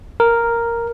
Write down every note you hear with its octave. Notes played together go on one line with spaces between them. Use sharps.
A#4